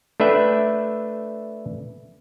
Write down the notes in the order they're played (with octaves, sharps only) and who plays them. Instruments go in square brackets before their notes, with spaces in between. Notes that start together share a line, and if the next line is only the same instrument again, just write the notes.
[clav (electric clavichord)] A3 D4 B4 E5 G5